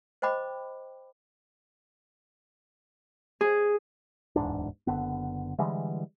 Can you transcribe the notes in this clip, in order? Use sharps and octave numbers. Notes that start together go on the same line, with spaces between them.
C5 D#5 G5 B5 D6
G#4
D1 E2 G#2 D4
F#1 D3 B3
D3 E3 G3 G#3